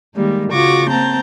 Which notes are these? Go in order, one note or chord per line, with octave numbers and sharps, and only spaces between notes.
D#3 G3 G#3 A#3
C#3 F4 F#4 C#6 D6 A#6
A#3 C4 A5 A#5 G6